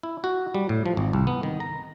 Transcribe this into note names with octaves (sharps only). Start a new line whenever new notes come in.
E4
F#4
G3
A2
F3
G#1
C2
B3
D#3
A#5